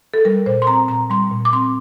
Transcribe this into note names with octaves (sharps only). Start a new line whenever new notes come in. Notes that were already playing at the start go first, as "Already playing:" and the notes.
A4
G3 A#4
A#2 C5
C6
C4 A#5
A#2 A#5
G3 C6
A#2
D6
C4 C6